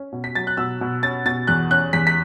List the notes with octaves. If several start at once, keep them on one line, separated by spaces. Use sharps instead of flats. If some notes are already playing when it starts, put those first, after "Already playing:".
Already playing: C#4
B2
B6
F#3 A6
F#6
B2 E6
B2
C#4 A6
B2 A6
E2 F#6
C#4 F#6
E2 B6
B6